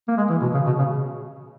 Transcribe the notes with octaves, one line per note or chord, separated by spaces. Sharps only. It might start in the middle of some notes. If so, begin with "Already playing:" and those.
A#3
G#3
E3
B2
C#3
B2
C#3